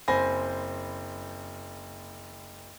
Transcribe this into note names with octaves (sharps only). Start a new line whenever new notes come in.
F#1 C4 C5 G#5 B5 A#6